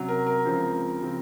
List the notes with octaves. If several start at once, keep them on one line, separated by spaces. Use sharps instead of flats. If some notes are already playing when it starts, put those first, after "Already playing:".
Already playing: C3 F#3 C#4
A#4
A#4
C#2 C#3 F3 C4
C#3 F3 C4